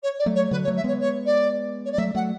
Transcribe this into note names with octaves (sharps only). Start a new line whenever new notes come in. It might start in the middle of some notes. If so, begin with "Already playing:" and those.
C#5
D5
F#3 A3
C#5
D3 F#3 B4
C#5
F#3 A3
E5
G#3 B3 C#5
C#5
D5
C#5
D5
F#3 A3 E5
F#3 A3 F#5